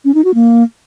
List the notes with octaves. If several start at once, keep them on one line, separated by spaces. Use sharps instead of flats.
C#4
D#4
F#4
A#3